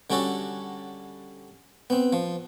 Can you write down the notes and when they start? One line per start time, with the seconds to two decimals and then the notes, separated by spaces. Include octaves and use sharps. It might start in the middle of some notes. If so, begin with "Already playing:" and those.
0.10 D3 G3 C#4 F#4 A4
1.90 B3 C4
2.13 F3